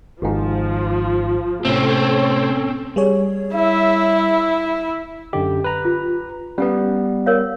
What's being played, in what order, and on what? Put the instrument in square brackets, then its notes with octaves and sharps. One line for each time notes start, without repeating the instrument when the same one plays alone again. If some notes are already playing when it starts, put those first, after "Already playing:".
[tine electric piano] G#1 G#2 [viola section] F3
[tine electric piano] A2 C3 A3 [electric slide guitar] C4 C#4 [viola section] A4 C#5
[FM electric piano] G3 G#4 C#5
[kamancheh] E4 [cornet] E5
[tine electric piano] F#2 D3 G4 [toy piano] D#5
[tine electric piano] B4 A#5
[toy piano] F4
[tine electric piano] G3 B3 [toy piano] C#4 F#5
[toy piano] A#4 C#5 F5